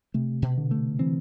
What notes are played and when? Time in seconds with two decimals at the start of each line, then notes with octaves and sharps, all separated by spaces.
0.14 C3 A3
0.42 B2
0.58 D3
0.71 A3
0.99 E3 C4